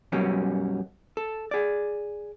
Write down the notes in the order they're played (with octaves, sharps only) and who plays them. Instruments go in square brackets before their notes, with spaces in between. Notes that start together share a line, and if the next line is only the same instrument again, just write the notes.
[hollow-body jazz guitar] F#2 B2 F#3 G3 A#3 C#4
A4
G#4 D5